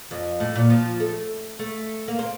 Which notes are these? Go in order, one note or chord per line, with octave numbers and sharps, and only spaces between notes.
F2
A2
A#2
F3
A3
A3
A#3
C4